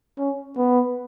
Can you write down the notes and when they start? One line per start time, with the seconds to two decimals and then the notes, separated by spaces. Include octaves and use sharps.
0.19 C#4
0.57 B3